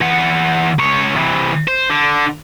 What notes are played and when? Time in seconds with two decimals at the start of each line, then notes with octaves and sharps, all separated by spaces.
0.01 E3 F#5
0.79 C#2 C#5
1.16 C3 E3
1.68 C5
1.90 D3